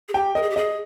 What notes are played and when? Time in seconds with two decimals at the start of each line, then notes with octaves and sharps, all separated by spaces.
0.08 G#4
0.14 G4 G5
0.35 A#4 D#5
0.42 G#4
0.50 G4
0.56 G#4 D#5